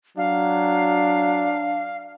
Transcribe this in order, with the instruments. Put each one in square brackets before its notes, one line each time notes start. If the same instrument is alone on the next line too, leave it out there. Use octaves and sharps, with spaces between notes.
[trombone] F#3 [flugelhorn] D4 [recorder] F5